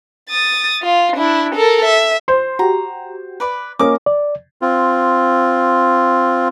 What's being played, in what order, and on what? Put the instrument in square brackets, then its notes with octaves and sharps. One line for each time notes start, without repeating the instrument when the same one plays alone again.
[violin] D#6 A6
F4
D4 E4
A4 A#4
E5
[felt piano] C5 [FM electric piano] C6
[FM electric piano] F#4 G4 [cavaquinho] A#5
[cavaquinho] B4 D5 B5
[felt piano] A#3 C#4 A#4 [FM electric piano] D#5 [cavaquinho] D6
[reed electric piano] D5
[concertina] C4 F4